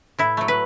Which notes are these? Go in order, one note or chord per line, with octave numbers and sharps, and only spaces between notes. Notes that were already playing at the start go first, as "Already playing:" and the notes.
A2 E4
F#3 A3
B4